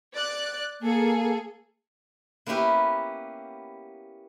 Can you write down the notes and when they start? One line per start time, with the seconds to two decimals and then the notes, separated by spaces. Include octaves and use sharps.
0.13 D5 F#6
0.81 A#3 G#4 A4
2.47 A#3 B3 C#4 E4 G4 B4